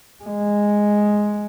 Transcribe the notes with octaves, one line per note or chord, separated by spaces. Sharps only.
G#3